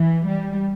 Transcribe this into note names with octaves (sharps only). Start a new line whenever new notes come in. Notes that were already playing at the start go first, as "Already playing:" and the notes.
Already playing: E3
G3